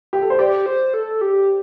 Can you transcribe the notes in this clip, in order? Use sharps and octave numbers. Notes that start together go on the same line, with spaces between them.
G4
A4
C5
G4 D5
C5
A4
G4